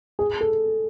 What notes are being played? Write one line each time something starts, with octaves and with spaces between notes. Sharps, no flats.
G#4
A4